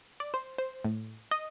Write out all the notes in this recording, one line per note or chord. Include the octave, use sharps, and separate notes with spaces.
D5
C5
C5
A2
D#5